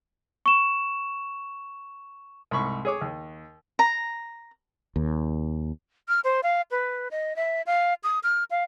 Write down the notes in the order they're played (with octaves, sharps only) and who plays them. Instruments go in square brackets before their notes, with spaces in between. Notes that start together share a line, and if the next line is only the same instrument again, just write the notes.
[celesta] C#6 E7
[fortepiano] C2 G#2 B5 C#6
G#4 C#5 D6
D#2
[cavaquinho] A#5
[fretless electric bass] D#2
[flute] F6
C5
F5
B4
D#5
E5
F5
D#6
F6
F5